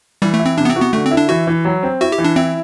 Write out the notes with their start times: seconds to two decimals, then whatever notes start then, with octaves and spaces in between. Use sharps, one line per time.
0.22 E3 G3
0.34 A3
0.40 E4
0.46 C4
0.58 C3 D4
0.65 B3
0.69 C4
0.76 B3 F#4
0.93 D3 A3
1.05 C4
1.11 E4
1.17 D4
1.29 E3 F#4
1.47 E3
1.65 F#3
1.83 C4
2.01 E4 F#4
2.12 G4
2.18 E3
2.25 D4
2.36 C4 E4